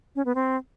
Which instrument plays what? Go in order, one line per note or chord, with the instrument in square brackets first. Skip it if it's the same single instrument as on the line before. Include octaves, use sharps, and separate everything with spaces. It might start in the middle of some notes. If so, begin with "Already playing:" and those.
[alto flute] C#4
B3
C4